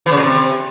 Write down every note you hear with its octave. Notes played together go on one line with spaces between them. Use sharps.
E3
C#3
A#2
C3